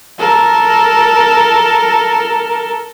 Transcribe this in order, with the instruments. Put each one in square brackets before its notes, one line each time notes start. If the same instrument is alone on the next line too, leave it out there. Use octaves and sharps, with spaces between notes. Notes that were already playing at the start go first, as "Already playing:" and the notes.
[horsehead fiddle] A4 A#4